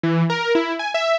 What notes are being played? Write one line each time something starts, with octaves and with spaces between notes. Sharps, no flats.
E3
A#4
E4
G#5
E5